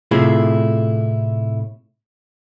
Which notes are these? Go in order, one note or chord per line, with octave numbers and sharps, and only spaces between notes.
A2 C3 A3 E4 F4 G#4